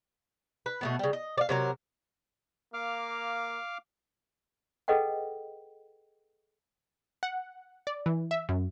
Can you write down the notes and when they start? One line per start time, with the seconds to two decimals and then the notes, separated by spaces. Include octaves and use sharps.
0.66 B4
0.81 B2 A3 B3
0.99 C#3 G3
1.13 D#5
1.38 D5 F5
1.49 C3 F#3 A#4
2.74 A#3 F5 D6 F6
4.88 G#4 A4 B4 D#5 F#5 G5
7.23 F#5
7.87 D5
8.06 E3
8.31 E5
8.49 F#2